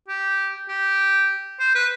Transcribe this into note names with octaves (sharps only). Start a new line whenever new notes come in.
G4
G4
C5
B4